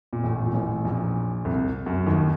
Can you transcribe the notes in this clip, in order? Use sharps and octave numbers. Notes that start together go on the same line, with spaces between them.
A#2
A1 A2
A#2
A1 A2
A#1 A#2
C2 C3
F#2
D#2 D#3